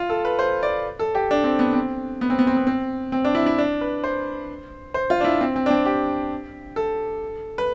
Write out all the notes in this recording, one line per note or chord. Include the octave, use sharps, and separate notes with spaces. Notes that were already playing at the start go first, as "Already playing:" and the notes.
Already playing: F4
A4
B4
C5
D5
A4
G4
D4
C4
B3
C4
B3
C4
B3
C4
B3
C4
C4
D4
E4
E4
D4
B4
C5
C5
F4
D4
E4
C4
C4
D4
C4
G4
A4
B4